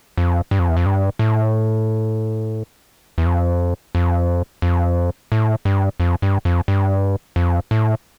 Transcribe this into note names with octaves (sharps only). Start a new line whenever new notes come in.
F2
G2
F2
E2
F2
G2
A2
E2
F2
F2
F2
A2
G2
F2
G2
F2
G2
F2
A2